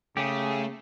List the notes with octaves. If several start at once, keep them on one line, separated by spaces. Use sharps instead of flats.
C#3 A3 G4 G#4